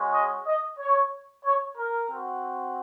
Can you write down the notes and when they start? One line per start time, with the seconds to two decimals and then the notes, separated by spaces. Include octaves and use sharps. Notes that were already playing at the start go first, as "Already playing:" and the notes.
Already playing: G#3 C#4 F#4
0.13 D#5
0.46 D#5
0.79 C#5
1.44 C#5
1.77 A#4
2.10 C4 F#4